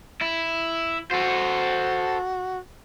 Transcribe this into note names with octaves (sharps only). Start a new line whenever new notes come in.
E4
F#4 A4 C5